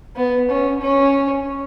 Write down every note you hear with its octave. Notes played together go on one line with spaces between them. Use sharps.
B3
C#4
C#4